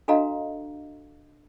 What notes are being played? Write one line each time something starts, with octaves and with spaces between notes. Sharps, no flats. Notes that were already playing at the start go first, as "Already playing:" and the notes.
D4 F#4 A4 D#5 F5 A#5